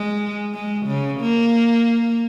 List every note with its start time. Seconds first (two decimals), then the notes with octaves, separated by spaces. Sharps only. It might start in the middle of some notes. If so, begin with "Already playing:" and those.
Already playing: G#3
0.53 G#3
0.87 C#3
1.21 A#3